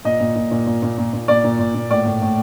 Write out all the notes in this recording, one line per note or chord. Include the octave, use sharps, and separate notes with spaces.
A#2 D#5
A#2
A#2
A#2
A#2
A#2
A#2
A#2
A#2 D5
A#2
A#2
A#2
A2 D5
A2
A2